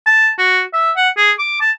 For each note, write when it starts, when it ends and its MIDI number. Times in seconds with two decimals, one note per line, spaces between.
0.06 0.31 81
0.39 0.62 66
0.73 0.91 76
0.96 1.09 78
1.17 1.32 68
1.39 1.57 86
1.61 1.71 81